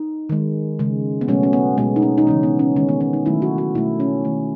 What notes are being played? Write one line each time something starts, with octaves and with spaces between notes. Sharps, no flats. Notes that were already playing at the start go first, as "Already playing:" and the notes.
Already playing: D#4
D#3 G#3
C#3 G#3
B3
B2 F#3 A3 C#4
C#4
B3
B2 G#3 B3
D#4
C#4
D#4
C#3 E3 G#3 C#4
B3
C#4
D#3 G#3 C#4
B3
C#4
D#4
D#3 F#3 A3 E4
F#4
F#4
B2 A3 E4
C#4
D#3 A3